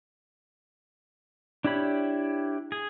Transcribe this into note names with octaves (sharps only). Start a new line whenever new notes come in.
D4 E4 G4 C#5 B5
G#4